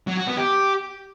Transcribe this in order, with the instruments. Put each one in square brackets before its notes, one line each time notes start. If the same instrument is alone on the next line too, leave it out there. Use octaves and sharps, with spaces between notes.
[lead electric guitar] F#3
F#4
B3
G4